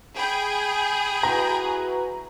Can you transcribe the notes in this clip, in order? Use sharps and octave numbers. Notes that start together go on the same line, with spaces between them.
G#4 G5 B5 G6
E4 F#4 B4 A#5